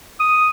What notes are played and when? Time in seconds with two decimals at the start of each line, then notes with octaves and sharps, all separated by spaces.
0.20 D#6